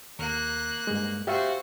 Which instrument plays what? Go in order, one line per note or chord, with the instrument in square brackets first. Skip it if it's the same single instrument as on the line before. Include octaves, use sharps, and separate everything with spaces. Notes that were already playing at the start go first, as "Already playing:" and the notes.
[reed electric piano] D#2 [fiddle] A#3 F#6
[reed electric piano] G2 G#3
[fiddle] F#4 C5 [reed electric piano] G4 E5 F5